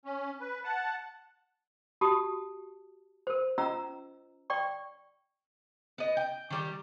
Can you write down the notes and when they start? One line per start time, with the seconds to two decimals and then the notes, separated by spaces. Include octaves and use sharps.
0.05 C#4
0.40 B4
0.64 F#5 A5
2.01 F#4 G4 A5 D#6
3.27 A#4 C5
3.58 C#4 F4 D#5 A#5 E6
4.50 D5 G5 C#6
5.98 B3 D#5
6.17 G5
6.50 D#3 G3 G4